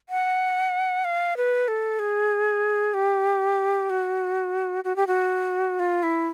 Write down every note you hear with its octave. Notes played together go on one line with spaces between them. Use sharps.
F#5
F5
B4
A4
G#4
G4
F#4
F#4
G4
F#4
F4
E4